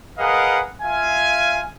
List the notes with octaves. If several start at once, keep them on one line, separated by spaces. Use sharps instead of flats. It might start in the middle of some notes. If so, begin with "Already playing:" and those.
G#4 A#4 B4 D#5 F5 F#5
F4 E5 F5 G#5